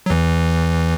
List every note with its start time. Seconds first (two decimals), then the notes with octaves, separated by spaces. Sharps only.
0.06 F#3
0.10 E2 E3